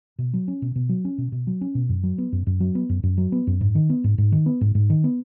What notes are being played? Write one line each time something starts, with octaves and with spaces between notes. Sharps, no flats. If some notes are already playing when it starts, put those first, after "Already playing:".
B2
F#3
C#4
B2
B2
F#3
C#4
B2
B2
F#3
C#4
B2
F#2
F#3
B3
F#2
F#2
F#3
B3
F#2
F#2
F#3
B3
F#2
G#2
D#3
B3
G#2
G#2
D#3
B3
G#2
G#2
D#3
B3